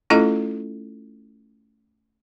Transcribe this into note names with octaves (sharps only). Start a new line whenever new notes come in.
A3 C#4 E4 F4 A4 D#5